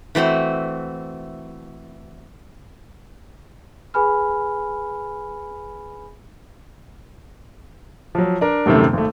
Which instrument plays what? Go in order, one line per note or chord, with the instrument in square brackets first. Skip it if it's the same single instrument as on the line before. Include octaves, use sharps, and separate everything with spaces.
[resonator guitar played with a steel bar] E3 A3 C4 F#4
[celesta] G#4 B4 G#5 B5 F6
[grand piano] F3 F#3
D4 A#4
D#1 F#2 C3 D#3 A3
G#1 A3